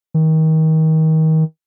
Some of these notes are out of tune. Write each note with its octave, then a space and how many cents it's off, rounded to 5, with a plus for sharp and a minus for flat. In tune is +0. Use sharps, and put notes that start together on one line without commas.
D#3 +30